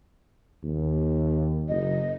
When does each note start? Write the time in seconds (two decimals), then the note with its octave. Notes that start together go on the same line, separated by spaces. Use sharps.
0.64 D#2
1.69 F#1 D#5